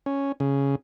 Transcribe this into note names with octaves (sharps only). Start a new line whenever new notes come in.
C#4
C#3